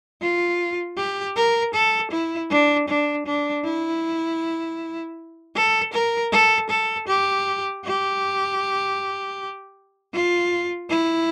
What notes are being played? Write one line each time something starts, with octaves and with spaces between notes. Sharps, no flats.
F4
G4
A#4
A4
E4
D4
D4
D4
E4
A4
A#4
A4
A4
G4
G4
F4
E4